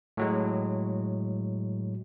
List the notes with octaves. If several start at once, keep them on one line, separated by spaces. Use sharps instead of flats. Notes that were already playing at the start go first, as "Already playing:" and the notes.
A2 F#3 G#3